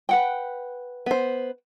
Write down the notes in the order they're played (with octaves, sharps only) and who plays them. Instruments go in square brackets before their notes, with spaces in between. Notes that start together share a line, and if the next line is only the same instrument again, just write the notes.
[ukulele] B4 F#5 G5
[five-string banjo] B3 C5